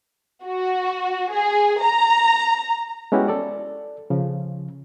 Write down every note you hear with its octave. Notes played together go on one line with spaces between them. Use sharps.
F#4
G#4
A#5
G#3 B3 C#4 E4 F#4 G4
A4 D5
C#3 F3